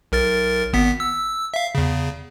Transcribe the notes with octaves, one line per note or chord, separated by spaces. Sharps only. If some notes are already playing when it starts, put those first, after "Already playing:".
B1 A#4 A6
G#1 B3 B6
E6
E5 F5
E2 C#3